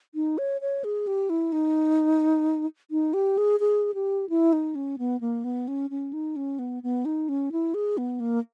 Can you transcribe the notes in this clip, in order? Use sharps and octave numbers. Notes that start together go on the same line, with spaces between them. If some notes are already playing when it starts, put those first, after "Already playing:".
D#4
C#5
C#5
G#4
G4
E4
D#4
D#4
G4
G#4
G#4
G4
E4
D#4
C#4
B3
A#3
B3
C#4
C#4
D#4
C#4
B3
B3
D#4
C#4
E4
G#4
B3
A#3